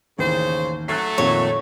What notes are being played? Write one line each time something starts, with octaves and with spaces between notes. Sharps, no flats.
A1 D#2 C#3 C5
F#3 A3 F#6 A6 C7
F2 A#2 D#3 C#5